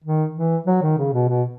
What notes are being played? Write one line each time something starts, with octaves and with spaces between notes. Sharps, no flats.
D#3
E3
F#3
D#3
C#3
B2
B2